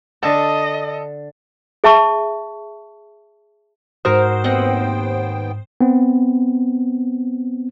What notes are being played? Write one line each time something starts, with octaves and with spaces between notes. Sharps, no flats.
D3 A4 D#5 A5
G#4 E5 A5 C#6
G#2 F#4 A#4 C5 D#6
D#2 B3 C4 D#5 F#5 G5
B3 C4